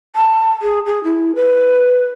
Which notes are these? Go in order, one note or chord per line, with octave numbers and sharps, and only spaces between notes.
A5
G#4
G#4
E4
B4